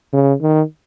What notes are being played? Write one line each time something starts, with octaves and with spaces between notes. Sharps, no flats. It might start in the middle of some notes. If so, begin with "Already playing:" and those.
C#3
D#3